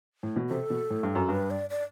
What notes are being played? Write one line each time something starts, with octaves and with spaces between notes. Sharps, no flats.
A2
B2
C3 A4
B2
A2
G2
F#2
G2 B4
D5
D5